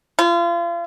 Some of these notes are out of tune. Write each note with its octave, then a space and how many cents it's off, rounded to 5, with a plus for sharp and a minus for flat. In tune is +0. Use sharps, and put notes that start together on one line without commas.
F4 -35